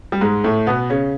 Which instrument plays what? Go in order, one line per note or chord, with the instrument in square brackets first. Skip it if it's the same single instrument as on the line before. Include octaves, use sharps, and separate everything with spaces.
[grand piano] G3
G#2 G#3
A2 A3
B2 B3
C#3 C#4